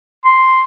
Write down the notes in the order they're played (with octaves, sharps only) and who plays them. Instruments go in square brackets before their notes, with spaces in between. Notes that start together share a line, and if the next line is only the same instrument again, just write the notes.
[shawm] C6